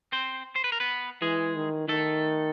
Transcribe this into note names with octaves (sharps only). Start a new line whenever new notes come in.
C4 C5
C5
B4
A#4
B3 B4
E3 G#3 G#4
D#3
D#3 A3 A4